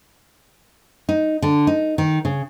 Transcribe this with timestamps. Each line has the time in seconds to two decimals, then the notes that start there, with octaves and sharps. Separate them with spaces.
1.09 D#4
1.42 D3
1.67 D#4
1.98 D#3
2.25 C#3